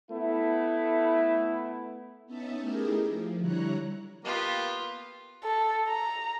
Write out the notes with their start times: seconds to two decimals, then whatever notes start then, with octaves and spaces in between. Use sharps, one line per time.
0.11 A3 B3 E4
2.26 B3 C#4 D#4 E5 A5
2.60 A3 D#4 E4 G4 G#4 A#4
3.08 F3
3.40 D3 G3 E4 C#5 A#5 F#6
4.25 A#3 B3 F4 G4
5.44 A4
5.87 A#5